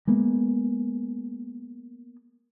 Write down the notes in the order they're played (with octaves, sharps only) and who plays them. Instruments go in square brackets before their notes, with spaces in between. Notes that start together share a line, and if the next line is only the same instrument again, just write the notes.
[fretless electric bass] G#3 A#3 B3